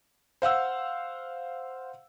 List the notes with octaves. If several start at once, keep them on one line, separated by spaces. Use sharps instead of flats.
C5 F5 F#5 E6